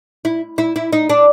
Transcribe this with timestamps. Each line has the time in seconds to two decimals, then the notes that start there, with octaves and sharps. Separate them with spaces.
0.25 E4
0.58 E4
0.76 E4
0.93 D#4
1.09 D4